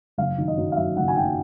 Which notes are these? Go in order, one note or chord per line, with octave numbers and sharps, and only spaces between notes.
F#1 F5
D#3
D#5
F#2
F5
F#3 E5
F#1 F#5
G#5
D#3 G5